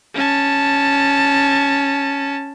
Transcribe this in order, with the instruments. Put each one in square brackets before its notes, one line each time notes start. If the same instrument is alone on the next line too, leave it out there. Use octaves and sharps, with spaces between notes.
[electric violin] C#4 A5